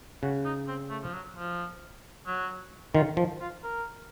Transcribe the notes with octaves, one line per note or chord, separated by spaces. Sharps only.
C#3 F#4
D#4
C4
A3
F3
F#3
F3
F#3
D#3 F4
F3
F4
A#4